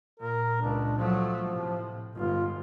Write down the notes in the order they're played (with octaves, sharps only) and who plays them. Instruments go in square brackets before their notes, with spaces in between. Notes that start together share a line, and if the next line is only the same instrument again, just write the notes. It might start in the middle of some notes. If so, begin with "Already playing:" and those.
[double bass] A#2 [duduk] A#4
[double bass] C#2 A#2 [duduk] D4
[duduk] F3 [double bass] F#3 A3
[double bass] A2 C3
[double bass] G1 G#2 [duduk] F4